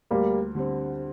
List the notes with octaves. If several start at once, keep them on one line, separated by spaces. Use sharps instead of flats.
D2 G3 A#3
D3 G3 C4